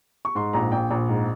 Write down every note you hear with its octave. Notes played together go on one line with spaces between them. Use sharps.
C#6
G#2 C6
A#1 A#5
A#1 G5
A#1
G#2